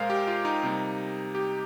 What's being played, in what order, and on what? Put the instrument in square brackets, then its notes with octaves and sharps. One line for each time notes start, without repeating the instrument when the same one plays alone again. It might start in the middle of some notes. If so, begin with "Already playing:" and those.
Already playing: [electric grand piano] A#2 G#3 A#4 C5 D5 F5
G4
F4
D#4
C3 G3 A#3
G4